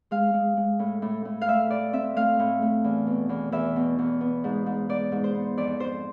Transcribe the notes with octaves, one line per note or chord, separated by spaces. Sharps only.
G#3 F5
G#3
G#3
A2
A2
A2
F5
A3 E5
A2 D5
C4 E5
A3 F5
A2
A3
E2
B2
E2
E2 E5
B2
E2
B3
G#2
G#2
G#2 D5
G#2
C5
B3
F2 D5
F2 C5